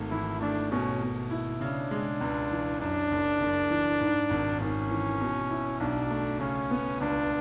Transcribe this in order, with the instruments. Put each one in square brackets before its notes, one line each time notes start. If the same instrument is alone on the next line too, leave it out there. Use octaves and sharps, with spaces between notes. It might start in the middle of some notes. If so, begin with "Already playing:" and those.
Already playing: [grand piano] G#1 A3
[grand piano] E3 [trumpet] E4
[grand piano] A3 [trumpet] D4
[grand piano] B2 [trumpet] C#4
[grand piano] B2
E4
[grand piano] C#3 [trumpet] D4
[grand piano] G#3
C#2
E3
[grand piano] F#2 [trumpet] D4
[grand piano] F#1
F#1
E3
G#2
G#1
[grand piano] G#1 [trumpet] C#4
[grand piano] E3
B2
E4
[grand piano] B1 [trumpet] D4
[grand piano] A3
[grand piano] C#3 [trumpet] C#4
[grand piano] B3
[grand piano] C#2 [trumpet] D4